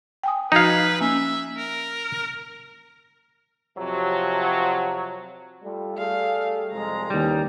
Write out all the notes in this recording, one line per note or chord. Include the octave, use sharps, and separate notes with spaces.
G5 G#5 D#6
F3 D#4 F#4 B4 F5 G#6
A#3 C#4 E5 G#5
A#4
F2 C3 F#3
G3 A3 F4
G3 A3 G#4 F5
C2 F2 G#3 A#5
D#2 C#3 E3 G3 D#4